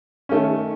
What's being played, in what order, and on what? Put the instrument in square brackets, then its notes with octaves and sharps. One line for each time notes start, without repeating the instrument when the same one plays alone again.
[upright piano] D#3 A3 C#4